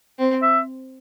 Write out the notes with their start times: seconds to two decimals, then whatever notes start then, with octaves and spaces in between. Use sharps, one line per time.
0.18 C4
0.42 E5